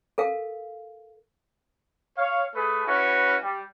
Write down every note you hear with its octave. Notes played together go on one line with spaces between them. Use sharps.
A4 A#4 F5
C#5 F5
A3 G#4 A4 B4
C#4 E4 F#4 B4
G3